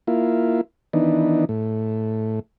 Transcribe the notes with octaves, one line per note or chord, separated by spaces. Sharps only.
A#3 E4 F4
D#3 E3 B3 D4 D#4
A2